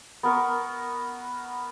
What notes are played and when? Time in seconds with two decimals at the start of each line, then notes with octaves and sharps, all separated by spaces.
0.23 B3 A#4 C#6